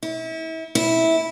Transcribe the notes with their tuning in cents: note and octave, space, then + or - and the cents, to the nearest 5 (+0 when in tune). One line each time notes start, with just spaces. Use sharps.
E4 -35
E4 -15